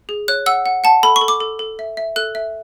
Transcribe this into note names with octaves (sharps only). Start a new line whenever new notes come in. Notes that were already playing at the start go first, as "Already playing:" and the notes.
G#4
C#5 F#6
F#5 E6
F#5
F#5 A5
A4 B5
C#6
A4
D6
A4
A4
E5
E5
A4 F#6
E5